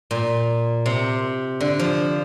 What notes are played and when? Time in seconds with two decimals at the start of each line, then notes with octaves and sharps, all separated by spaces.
0.11 A#2
0.86 C3
1.60 D3
1.79 F3